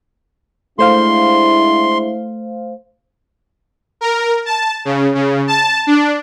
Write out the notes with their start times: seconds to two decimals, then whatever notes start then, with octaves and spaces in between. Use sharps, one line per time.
0.79 G#3 A3 D4 E4 C5 F5 C6
4.01 A#4
4.45 A5
4.85 C#3
5.15 C#3
5.47 A5
5.87 D4